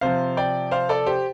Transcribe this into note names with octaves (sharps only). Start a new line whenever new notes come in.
C3 F3 C5 F5
D5 G5
C5 F5
A4 D5
G4 C5